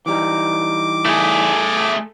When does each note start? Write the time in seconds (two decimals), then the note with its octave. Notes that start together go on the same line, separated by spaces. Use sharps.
0.06 E3 G3 D#4 D6
1.06 A3 G#4